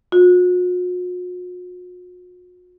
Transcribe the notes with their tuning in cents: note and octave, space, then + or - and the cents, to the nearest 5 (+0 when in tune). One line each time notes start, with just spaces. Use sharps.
F#4 -45